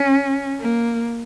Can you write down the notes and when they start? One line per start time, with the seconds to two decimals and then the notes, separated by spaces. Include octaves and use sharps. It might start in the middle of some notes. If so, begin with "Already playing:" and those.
Already playing: C#4
0.60 A#3